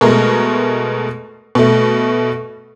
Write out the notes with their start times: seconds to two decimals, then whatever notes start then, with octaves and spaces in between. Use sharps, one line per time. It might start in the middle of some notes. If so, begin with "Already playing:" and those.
0.01 B2 G#3 A3 A#4
1.55 B2 A3